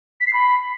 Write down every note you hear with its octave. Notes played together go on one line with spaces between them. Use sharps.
B6
C7
B5